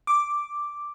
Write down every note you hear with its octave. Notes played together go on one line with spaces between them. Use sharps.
D6